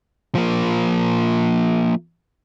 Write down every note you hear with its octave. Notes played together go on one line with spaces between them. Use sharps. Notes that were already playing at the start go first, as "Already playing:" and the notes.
F3 A#3